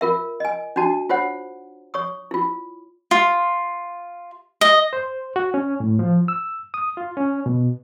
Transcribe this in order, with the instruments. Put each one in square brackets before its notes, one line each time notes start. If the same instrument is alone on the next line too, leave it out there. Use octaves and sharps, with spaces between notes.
[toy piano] F4 A#4 E5
D#5 G#5
D4 D#4 F#4 A5
F4 C5 C#5 F#5
C#5 C#6 D#6
E4 F4
[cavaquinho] F4
D#5
[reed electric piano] C5
F#4
C#4
A2
F3
E6
D#6
F4
C#4
B2